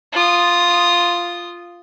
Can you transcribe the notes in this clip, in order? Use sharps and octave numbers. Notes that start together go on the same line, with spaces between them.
F4 D#6